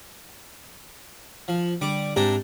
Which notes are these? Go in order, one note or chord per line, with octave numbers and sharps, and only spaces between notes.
F3
D3 G3 D6
G#2 C3 D4 G4 A#5